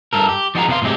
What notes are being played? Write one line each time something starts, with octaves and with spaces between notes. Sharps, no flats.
G2 A4 A#4
G4
F3 D#4 F#4 G#4 A#5
C3 B3 A4 F5 C6
A2 C3 F#3 G#3 G4